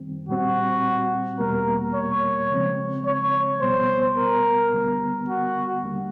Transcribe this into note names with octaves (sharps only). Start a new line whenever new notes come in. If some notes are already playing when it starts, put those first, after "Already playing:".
Already playing: F#2 D#3 G3 C4
A#2 G3 C4 F#4
E2 B2 G3 A#3 A#4
C#5
C#3 F3 G#3 C4
C#5
C2 B2 G3 B3 C5
A#4
D2 D3 G3 B3
F#4
D#2 D3 G3 A#3